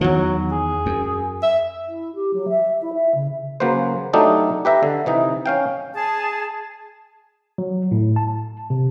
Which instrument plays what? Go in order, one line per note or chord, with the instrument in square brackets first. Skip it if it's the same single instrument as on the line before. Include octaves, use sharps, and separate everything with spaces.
[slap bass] E2 D#3 [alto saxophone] F#3
[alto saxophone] G#4
[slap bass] F#2
[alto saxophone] E5
[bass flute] E4
G4
F#3
E5
E4
E5
C#3
[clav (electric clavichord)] C#3 F#3 A#3 B4 C5
F#3 A3 D4 D#4 G4 A4
G4 B4 E5 A#5
D3
C3 E3 D#4
C#4 F5 G5
[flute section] G#4 A5
[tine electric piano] F#3
A2
A5
C3